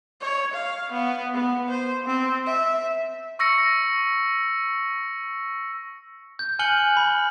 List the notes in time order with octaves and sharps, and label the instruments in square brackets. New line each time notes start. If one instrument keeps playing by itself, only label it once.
[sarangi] C#5
F5
B3
B3
C5
C4
E5
[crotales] C#6 E6 A#6 C#7
[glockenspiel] G6
G#5 F6 F#6 C#7 F#7 G7
B5